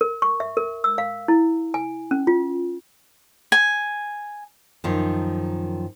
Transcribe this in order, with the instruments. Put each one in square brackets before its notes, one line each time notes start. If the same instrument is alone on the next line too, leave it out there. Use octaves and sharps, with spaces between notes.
[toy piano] A#4
C#6
E5
A#4
E6
F5
E4
G#5
C#4
F4
[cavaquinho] G#5
[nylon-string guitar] F#2 D#3 F3